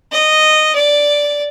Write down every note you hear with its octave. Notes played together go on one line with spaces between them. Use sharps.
D#5
D5